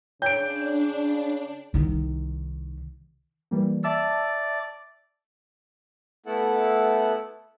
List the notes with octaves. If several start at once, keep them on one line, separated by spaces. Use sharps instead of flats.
C#3 D4 C#5 G5 G6 D7
C2 D#3
E3 G3 A#3
D5 E5 A5 E6
A3 B3 E4 A4 F#5